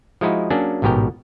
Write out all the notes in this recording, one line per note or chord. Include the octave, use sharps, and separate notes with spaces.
F3 G#3 D#4 E4 F#4
F#3 A#3 C#4 D4 G#4
A1 G#2 B2 G4 A#4 G5